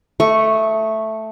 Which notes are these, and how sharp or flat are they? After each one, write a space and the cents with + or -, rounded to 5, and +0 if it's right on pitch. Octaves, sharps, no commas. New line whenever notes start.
A3 +0 D#5 +35 C#6 +0